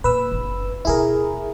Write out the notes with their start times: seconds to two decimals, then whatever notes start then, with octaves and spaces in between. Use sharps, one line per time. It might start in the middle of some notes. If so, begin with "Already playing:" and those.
0.04 A#2 B4 E6
0.31 F#1 D3
0.85 D2 B2 E4 G#4 A#4